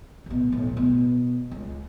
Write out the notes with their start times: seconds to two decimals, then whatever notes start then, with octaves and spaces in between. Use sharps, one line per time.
0.26 A1 B2
0.52 B1 A2
0.77 B2
1.51 C#2